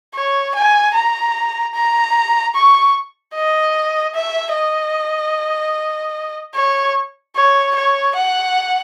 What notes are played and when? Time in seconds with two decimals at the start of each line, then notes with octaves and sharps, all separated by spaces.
0.15 C#5
0.55 G#5
0.94 A#5
1.75 A#5
2.55 C#6
3.35 D#5
4.15 E5
4.55 D#5
6.55 C#5
7.36 C#5
7.75 C#5
8.16 F#5